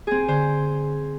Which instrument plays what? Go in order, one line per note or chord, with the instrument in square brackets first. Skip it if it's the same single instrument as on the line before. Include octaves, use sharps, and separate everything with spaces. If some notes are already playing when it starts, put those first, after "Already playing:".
[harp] C4 G#4
[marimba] D3 [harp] C5